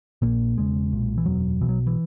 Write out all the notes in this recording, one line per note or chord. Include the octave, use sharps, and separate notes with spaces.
A#1 A#2 A#3
E1 E2 C#3 G#3
B1 A#2
E3
F#1 E2 B2 F#3
B1 B2 E3
F#3
E3